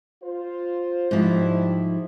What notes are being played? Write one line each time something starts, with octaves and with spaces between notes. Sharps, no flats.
F4 C5
G#2 F3 G3 E4